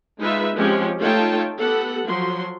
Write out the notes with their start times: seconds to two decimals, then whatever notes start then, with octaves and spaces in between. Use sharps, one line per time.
0.19 G#3 D#4 F4 B4 E5
0.56 F3 G#3 C4 C#4 G4
1.00 A3 D#4 F4 C#5 G5 A5
1.57 B3 G4 A4 F#5
2.05 F3 F#3 F#4 C6